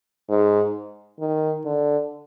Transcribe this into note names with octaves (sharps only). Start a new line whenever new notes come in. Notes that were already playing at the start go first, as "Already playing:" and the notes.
G#2
D#3
D3